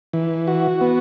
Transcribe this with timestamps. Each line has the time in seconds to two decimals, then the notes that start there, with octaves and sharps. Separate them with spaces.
0.13 E3
0.47 F#4
0.81 B3